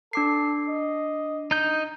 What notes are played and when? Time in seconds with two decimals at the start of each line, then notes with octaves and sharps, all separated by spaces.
0.13 D4 A4 D6 C7
0.69 D#5
1.51 D#4 G6